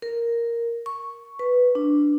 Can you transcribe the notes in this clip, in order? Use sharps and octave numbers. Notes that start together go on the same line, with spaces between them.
A#4
C#6
B4
D4